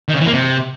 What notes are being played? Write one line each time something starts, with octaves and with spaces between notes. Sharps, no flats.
D#3
C#3
E3
A#3
C3